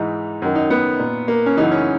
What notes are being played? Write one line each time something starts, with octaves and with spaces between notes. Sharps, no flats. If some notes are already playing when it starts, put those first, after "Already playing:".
Already playing: G#2 E3 D#4
F#2 D#3
D#4
B3
A#2
A#3
C#4
F#2 C#3 E3 D#4
C#4